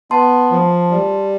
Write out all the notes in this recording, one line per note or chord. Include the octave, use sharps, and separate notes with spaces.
B3 A5 C6
F3
G3